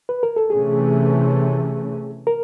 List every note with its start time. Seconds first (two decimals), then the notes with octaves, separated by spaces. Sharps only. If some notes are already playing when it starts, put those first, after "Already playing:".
0.09 B4
0.23 A#4
0.36 A4
0.49 C3 E3 A3 C#4 G#4
2.27 A#4